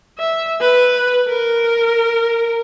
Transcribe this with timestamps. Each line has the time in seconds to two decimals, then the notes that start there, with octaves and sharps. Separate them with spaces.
0.19 E5
0.61 B4
1.28 A#4